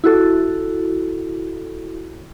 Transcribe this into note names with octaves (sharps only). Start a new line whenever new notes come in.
E4 F#4 A4